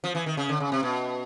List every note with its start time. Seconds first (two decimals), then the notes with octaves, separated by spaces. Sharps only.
0.04 F3
0.15 E3
0.26 D#3
0.37 C#3
0.49 D3
0.60 C#3
0.72 C3
0.83 B2